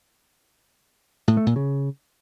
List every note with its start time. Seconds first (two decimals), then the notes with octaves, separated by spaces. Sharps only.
1.28 A2
1.37 A3
1.46 A#2
1.56 C#3